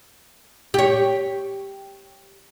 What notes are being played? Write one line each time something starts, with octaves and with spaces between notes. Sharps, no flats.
G4 C#5